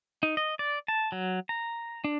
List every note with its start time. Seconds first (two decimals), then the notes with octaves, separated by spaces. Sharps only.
0.23 D#4
0.37 D#5
0.59 D5
0.88 A5
1.12 F#3
1.49 A#5
2.04 D4